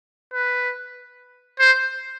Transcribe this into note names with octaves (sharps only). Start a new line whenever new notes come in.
B4
C5